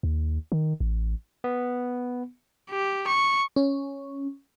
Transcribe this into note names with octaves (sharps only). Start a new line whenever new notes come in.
D#2
D#3
A1
B3
G4
C#6
C#4